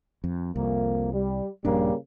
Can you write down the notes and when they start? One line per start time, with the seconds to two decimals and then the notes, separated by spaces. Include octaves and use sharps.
0.24 F2
0.56 C2 F2 A#3
1.13 G3
1.65 A#1 G2 C#3 G3 A#3 D4